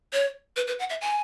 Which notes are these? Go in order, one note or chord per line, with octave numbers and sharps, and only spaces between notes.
C#5
B4
B4
F#5
E5
G#5